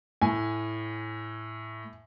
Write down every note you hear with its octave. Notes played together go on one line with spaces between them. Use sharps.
A2 G#5